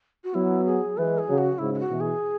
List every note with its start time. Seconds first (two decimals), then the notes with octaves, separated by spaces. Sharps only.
0.24 F#4
0.34 F#3 B3 E4
0.65 G#4
0.97 E3 G#3 B4
1.18 G#4
1.27 C#3 F#3
1.38 F#4
1.58 G#2 C#3 E4
1.74 E4
1.79 F#4
1.89 B2 E3
2.01 G#4